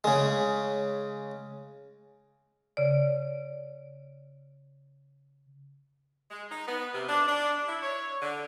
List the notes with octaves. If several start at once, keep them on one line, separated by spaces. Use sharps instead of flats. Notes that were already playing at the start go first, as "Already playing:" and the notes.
C#3 G#3
C#3 D5
G#3
D#4
B3
C3
D4
D4
E4
C#5
D3